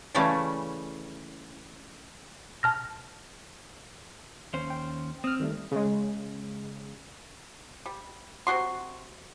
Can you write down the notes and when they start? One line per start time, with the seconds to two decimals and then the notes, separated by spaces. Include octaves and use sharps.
0.15 C#3 E3 G3 A3 C#4
2.63 A5 F6 A#6
4.53 D#2 C#4 C5
4.70 G5
5.24 C4 D#6 F6
5.40 D#3 G3 A3
5.71 C#3 G#3
7.86 G3
8.47 C3 F3 F#4 C6